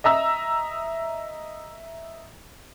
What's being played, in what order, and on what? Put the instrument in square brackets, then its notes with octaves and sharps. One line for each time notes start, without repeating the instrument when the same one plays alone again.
[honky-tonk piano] D#5 E5 A#5 E6